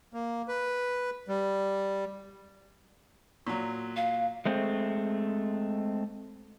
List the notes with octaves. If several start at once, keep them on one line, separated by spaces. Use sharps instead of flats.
A#3
B4
G3
A#2 F#3
F5
G#3 A3 C4